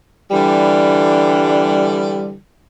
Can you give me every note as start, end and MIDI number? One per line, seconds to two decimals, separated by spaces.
0.31 2.35 50
0.31 2.35 52
0.31 2.35 55